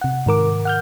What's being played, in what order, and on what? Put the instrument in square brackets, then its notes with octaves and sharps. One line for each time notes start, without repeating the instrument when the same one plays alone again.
[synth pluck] C3 F#5
G#2 D#3 A#4 D6
F#5 F6 G6